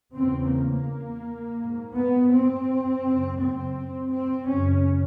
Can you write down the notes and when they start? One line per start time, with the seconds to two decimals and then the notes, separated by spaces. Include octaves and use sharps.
0.15 E2 C#3 C4
0.51 A#3
1.58 G#2
1.95 B3
2.32 C4
3.04 F#2 C#3
3.39 C4
4.12 C4
4.48 F#2 C#3 C#4